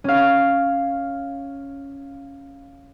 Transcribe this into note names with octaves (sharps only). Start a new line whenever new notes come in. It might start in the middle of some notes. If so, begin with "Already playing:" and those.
C#4 F5